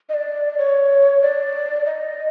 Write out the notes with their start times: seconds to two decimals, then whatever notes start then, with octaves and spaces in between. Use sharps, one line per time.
0.09 D#5
0.14 D5
0.58 C#5
1.22 D5
1.85 D#5